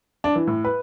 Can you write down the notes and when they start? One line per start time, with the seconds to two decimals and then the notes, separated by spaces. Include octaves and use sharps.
0.24 D4
0.35 E3
0.47 A2
0.65 B4